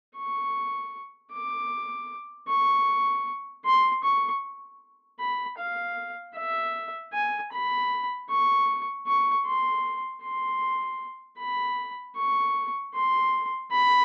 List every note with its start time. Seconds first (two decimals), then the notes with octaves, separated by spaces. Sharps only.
0.17 C#6
1.33 D6
2.48 C#6
3.65 C6
4.03 C#6
5.19 B5
5.58 F5
6.36 E5
7.13 G#5
7.52 B5
8.30 C#6
9.07 C#6
9.46 C6
10.23 C6
11.38 B5
12.16 C#6
12.94 C6
13.71 B5